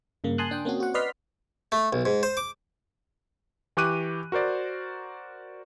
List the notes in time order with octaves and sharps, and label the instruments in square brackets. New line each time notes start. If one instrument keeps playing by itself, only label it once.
[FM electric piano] G2 C#3 A#3
G#5 A5 C6 D#6 F#6
D4 G5
A#3 C4 C#4 F#4
F#4 F#5
B4 D5 D#5 C6 F6 B6
[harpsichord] A3
B1
G#2
C5
D6
[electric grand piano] E3 G4 C#6 D6 F#6 D#7
F#4 A#4 C5 D5